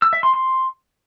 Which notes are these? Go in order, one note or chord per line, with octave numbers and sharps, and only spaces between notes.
E6
E5
C6
C6